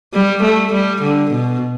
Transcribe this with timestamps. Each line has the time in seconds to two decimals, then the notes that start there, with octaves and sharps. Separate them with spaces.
0.14 G3
0.43 A3
0.72 G3
1.02 D3
1.31 B2